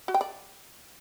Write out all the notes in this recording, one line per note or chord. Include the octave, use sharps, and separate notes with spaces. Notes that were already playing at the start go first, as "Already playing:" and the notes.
F#4
G5
D5